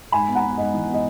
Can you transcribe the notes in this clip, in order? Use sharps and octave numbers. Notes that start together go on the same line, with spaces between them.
G#2 G#5 B5
B3
F#5 A#5
B3
G#2 D#5
E3
B3
D#5